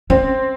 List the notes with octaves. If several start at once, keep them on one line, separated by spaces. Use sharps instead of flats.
C4 C#4